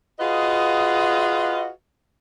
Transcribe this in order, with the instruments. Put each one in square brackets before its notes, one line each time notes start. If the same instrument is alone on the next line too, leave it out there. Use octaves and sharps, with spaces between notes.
[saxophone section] F4 F#4 G#4 B4 D#5 F5